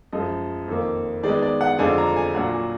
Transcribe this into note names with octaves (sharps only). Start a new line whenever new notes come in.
F#2 F3 G#3 D#5
F2 D#3 A#3
D#3 G#3 B3 D#4 D5
D5
F#5
F2 D3 G#3 D4 F4 G#5
A#5
G#5
A#2 F#3 D4 F4 F#5
G#5